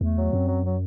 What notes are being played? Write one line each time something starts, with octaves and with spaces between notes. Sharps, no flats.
E2 A3
F#3
F#2 C4
F#3
F#3